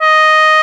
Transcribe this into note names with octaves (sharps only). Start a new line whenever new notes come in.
D#5